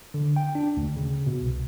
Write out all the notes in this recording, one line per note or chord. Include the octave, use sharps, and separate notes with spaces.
D3
G5
D4
D2
C#3
B2
C2